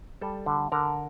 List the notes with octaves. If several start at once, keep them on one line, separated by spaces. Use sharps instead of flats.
G3 A4
D3
D3 A#4